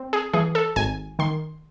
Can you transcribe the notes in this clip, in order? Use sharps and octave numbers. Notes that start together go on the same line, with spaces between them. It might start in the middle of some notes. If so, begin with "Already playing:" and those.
Already playing: C4
G#4
E3 G#4
A4
G#1 G#5
D#3 C6